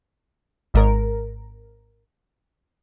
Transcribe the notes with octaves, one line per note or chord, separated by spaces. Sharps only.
G#1 G#2 A#4